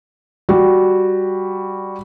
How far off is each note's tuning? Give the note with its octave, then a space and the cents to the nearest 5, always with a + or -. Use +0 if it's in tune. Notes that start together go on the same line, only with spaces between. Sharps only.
G3 +0 F#4 +0